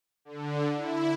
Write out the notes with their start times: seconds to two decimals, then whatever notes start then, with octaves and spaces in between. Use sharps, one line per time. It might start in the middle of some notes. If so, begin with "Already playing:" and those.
0.25 D3
0.75 E4